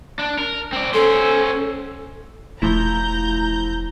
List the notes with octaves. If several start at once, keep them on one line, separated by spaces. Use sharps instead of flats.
D4
A#4
C4 D5
C#4 A4 C5
E1 F3 A3 E4 A#5 G6